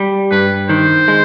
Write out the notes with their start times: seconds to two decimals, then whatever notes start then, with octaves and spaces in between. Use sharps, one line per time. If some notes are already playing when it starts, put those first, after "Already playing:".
Already playing: G3
0.31 G2 B4
0.69 D#3 C5
1.08 G#3